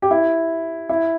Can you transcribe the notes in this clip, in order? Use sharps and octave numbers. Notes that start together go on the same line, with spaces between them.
G4
E4
E4